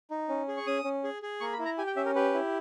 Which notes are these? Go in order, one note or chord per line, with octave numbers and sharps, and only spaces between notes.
D#4
C#4
G#4
C#6
C#4 D#6
C#4
G#4
G#4
A#3 C#6
B5
E4
A#5
G4 G#5
G5
C#4 E5
A#4
G4 B4
E4